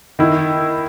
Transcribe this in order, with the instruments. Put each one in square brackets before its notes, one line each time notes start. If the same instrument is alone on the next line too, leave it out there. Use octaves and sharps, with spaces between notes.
[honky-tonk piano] D#3 E4